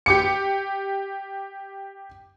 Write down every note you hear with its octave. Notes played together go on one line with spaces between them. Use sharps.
G4 D6 C#7